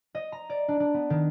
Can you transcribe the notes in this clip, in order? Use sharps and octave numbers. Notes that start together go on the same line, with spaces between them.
D#5
A#5
D5
D4
D4
B3
D#3